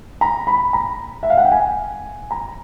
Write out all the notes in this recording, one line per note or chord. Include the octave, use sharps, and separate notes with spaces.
A#5
B5
A#5
E5
F5
F#5
G5
G#5
A#5